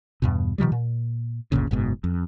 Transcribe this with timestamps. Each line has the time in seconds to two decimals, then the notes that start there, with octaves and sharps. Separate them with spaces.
0.22 E2 G2 B2
0.58 B2 D#3 F3 G3
0.72 A#2
1.52 G1 D2 A#2 C#3
1.71 F#1 G#2 B2
2.04 F2